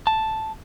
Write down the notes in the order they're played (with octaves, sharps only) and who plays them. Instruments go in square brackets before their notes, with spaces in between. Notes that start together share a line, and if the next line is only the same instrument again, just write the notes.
[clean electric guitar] A5